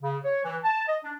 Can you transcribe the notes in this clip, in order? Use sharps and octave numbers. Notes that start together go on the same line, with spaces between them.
C#3
C#5
E3
A5
D#5
D4